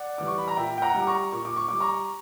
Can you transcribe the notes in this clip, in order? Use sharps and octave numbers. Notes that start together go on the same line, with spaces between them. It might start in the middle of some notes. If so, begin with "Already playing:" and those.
Already playing: D5 F#5
E3 G3 D6
C#6
B5
A#5
A#2 E5 G5
G5
F#5 A#5
G3
D6
A#5 C#6
A#2 C#6
D6
C#6
G3 D6
A#5 C#6